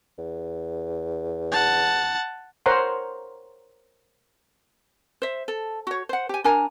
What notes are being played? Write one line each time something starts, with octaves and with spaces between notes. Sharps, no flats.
E2
F#5 A5
A#4 C5 C#5 F#5 A#5 C6
C5 E5
A4
F#4 C#5
C5 F#5
G4 G#5
D4 A#4 G#5 A#5